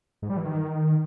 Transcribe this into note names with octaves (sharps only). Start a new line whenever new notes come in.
G#2
G3
E3
D#3